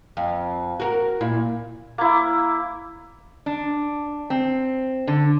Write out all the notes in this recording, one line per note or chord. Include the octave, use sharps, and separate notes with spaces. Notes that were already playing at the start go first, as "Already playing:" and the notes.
F2
F#4 A#4
A#2 E4
A#3 E4
D4
C4
D3